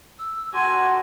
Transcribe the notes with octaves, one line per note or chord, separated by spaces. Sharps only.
E6
A#2 D3 F#4 G#5 C6